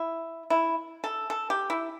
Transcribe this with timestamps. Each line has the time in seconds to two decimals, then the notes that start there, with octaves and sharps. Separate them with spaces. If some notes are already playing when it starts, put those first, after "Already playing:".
Already playing: E4
0.50 E4
1.04 A4
1.30 A4
1.50 G4
1.70 E4